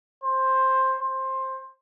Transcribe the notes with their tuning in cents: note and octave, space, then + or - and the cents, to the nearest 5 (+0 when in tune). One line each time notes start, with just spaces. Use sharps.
C5 +10
C5 +15